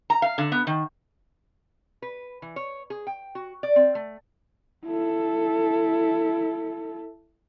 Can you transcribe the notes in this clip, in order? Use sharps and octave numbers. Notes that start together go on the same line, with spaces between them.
A#5
F5
D3
B3
D#3
B4
E3
C#5
G#4
G5
F#4
D5
C4
A3
E4 A4